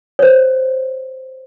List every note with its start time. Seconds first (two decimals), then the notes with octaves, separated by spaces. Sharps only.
0.19 C5 C#5